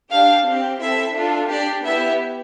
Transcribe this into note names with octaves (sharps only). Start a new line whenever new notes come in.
D4 G4 F5
C4 G4
C4 E4 A4 E5
D4 F4 A4
D4 G4 D5
B3 E4 G4 E5